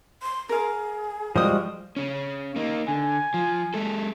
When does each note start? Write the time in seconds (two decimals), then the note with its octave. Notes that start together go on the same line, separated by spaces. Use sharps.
0.22 C6
0.49 G#4 A#4 F5
1.36 F3 G3 G#3 F#4 C5 D#6
1.96 C#3 C#4
2.56 A#3 D#4
2.88 D3 G#5
3.34 F3
3.74 G#3 A4